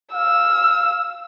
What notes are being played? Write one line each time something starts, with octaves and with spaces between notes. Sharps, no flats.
F5 E6